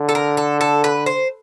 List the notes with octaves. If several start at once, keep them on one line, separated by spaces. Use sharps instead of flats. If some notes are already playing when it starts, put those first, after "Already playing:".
Already playing: D3
A4
A#4
A4
A4
B4
C5